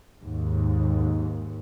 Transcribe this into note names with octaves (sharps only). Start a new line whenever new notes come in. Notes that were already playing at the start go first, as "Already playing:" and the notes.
D#2 G#2